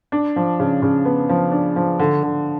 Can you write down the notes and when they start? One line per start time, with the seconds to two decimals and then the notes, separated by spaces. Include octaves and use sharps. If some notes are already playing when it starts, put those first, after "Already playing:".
0.12 D4
0.36 F3
0.59 C#3
0.82 C#3
1.05 B3
1.29 F3
1.52 D4
1.76 F3
1.99 D3
2.23 D3